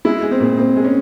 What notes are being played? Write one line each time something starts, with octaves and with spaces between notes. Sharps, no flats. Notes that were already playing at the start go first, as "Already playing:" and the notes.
G#3 E4
G#3
C4
A#2
A#2 C4
G#3
C#4